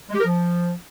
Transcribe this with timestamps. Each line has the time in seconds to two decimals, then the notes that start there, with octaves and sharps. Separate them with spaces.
0.10 G#3
0.15 G4
0.20 A#4
0.25 F3